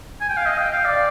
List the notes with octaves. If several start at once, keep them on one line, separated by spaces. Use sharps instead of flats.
G#5
G5
F5
D#5
G5
F5
D5